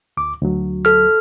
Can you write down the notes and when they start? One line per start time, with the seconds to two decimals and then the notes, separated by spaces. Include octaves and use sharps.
0.17 D2 D6
0.42 D2 F#3
0.85 A4 F6